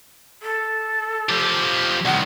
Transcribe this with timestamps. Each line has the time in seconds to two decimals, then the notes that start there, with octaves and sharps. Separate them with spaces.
0.42 A4
1.29 F3 G4
2.05 C2 D#3 F#5